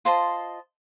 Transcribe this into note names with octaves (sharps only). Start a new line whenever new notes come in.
F4 C5 D#5 A5